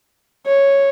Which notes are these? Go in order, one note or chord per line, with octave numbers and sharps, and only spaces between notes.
C#5